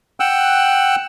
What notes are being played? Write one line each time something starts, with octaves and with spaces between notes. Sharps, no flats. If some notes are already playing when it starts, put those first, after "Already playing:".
F#5 G5 E6 F#6